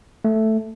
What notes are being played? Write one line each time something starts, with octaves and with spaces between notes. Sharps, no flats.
A3